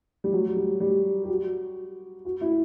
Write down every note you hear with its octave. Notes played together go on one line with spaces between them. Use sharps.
G3
F#3
G3
G3
G4
F#4
F#4
E4